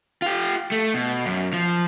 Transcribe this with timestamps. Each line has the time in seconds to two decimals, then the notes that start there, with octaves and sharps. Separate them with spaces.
0.22 F4 G4
0.72 A3
0.95 B2
1.26 F#2
1.53 F3